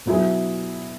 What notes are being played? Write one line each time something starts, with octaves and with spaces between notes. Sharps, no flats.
B2 F#3 B3 E4 G#4